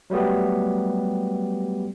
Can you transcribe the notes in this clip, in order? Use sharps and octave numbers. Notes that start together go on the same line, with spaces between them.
F#3 G3 A3 B3 G4